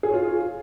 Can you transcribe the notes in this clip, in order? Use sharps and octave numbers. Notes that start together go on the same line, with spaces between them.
G#4
C#5
F4